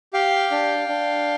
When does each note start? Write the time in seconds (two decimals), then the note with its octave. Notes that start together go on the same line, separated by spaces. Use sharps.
0.13 G4 F5 G5
0.51 D4
0.89 D4